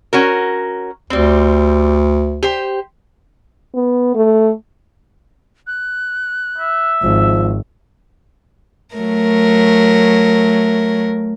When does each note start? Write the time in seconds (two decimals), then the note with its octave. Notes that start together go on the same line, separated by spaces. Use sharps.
0.13 C#4 F#4 A#4
1.10 D2 G3 C4
2.43 G4 C5
3.74 B3
4.15 A3
5.67 F#6
6.58 E5
7.03 G#1 F3
8.95 F#3 A3 A#4